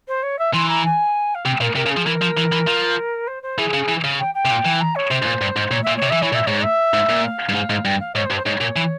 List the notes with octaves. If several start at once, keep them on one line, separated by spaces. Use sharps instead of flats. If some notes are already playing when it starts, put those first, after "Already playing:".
C5
C#5
E5
E3 C6
A#5
G#5
F5
C3 G5
A#2 A#4
C3 A#4
C#3
G#4
F3
E3 A#4
F3
E3
E3
F3
C5
C5
E3 G#4
C#3
E3
C#3
G5
G5
C3
A#2
E3
A#5
C#5
C3 C5
G#2
A#2
G2
G#2
A#2 C#5
A#2 E5
C#5
C3
E3 E5
E3 C#5
A#2 E5
G#2 C#5
E5
G#2
A#2
F5
G2
G#2
G#2
G2 G5
F5
G#2 C#5
C5
G2
C5
G#2 C#5
A#2
E3